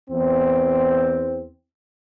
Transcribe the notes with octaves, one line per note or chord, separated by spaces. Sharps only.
E2 C4